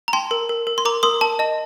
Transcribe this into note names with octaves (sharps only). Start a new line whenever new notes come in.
A#5
G5 A5 C6
A#4
A#4
A#4
C6
A#4 A#5 D6
A#4 C6 D#6
A#4 A5
D#5 A5